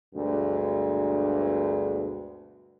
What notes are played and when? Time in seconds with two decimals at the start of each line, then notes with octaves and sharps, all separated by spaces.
0.14 D2 G2 B2 G#3